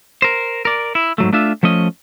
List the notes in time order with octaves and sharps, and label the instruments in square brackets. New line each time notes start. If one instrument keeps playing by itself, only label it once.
[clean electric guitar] A#4 C5
A#4 D5
E4
G#2 F#3 A3
A3 D4 F4 E5
F3 A3 C#4 D#5